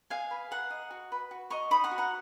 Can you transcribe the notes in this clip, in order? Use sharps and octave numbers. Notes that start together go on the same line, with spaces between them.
G#4 F5 G#5
B4
G#4 F#5 A#5
D#5
F#4
B4
F#4
D#5 A#5 C#6
D#4 B5 D#6
F#5 A#5
F#4
F#5 A#5